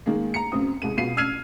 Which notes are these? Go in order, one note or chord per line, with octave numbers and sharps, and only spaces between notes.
D#3 G#3 A#3
A#5 C#7
C#2 F#2 C4 D#6
C2 G#3 D#7
B2 F4 C7 D#7
E6 F6 G#6 C7 D#7 F7